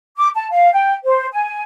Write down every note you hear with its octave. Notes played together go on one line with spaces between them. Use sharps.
D6
A5
F5
G5
C5
G#5